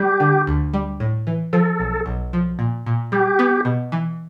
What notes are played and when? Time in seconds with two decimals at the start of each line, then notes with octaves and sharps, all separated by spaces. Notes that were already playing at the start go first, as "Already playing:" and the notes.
Already playing: G3 G4
0.20 D3
0.47 D2
0.74 G3
1.00 A2
1.27 E3
1.53 F3 A4
1.80 B1
2.06 B1
2.33 F3
2.59 A#2
2.86 A#2
3.12 G3 G4
3.39 B3
3.65 B2
3.92 E3